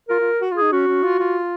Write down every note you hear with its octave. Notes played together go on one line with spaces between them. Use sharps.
F4 A#4
F4
F#4
F4 G#4
D#4
C#4 F#4
C#4
F4
F4